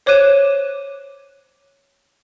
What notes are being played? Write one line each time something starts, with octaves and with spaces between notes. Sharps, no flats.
C5 C#5 D6 F#6 D#7 E7